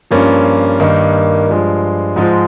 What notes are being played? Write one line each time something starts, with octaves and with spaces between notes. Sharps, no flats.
G2 F3 A#3 C#4 F4
G2 D#3 A#3 D#4
G2 F3 G#3
G#2 F3 G#3